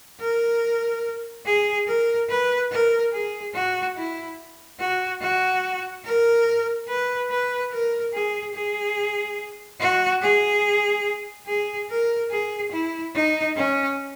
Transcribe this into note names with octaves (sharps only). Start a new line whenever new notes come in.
A#4
G#4
A#4
B4
A#4
G#4
F#4
E4
F#4
F#4
A#4
B4
B4
A#4
G#4
G#4
F#4
G#4
G#4
A#4
G#4
E4
D#4
C#4